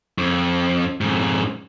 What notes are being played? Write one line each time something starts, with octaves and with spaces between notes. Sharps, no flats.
F2
F2 G#2